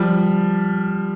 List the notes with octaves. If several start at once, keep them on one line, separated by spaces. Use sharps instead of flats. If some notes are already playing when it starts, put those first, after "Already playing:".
Already playing: F3 G3